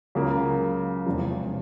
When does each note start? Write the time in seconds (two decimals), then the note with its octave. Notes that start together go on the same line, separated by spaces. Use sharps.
0.15 C#2 C#3 F#3 A#3
1.06 E1 E2 C3 F3